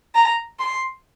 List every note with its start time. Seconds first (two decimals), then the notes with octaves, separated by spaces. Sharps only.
0.15 A#5
0.59 C6